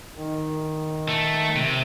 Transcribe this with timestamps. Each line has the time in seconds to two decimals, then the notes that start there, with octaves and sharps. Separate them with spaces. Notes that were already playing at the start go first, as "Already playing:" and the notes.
0.16 D#3
1.09 A3
1.57 C3